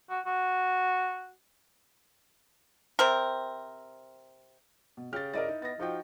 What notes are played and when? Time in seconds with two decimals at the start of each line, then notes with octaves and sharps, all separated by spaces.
0.10 F#4
0.26 F#4
2.99 C3 C4 A#4
4.97 B2
5.13 C#3 G4 F6 A6
5.33 E4 A#4 D5 D#5 A6
5.48 D#4
5.62 B3 A6 A#6
5.79 F3 D#4 F#4 G5